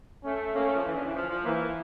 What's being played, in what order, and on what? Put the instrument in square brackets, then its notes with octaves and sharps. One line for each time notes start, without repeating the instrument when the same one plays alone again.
[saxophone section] A3 [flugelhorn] C#4
[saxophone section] A#3 [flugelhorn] C#4
[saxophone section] A3
F3
E3
D3
E3
F3
F3
[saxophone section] E3 [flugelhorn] A#3